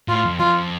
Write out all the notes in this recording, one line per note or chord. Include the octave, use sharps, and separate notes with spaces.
A2 F4
F2
F2 F4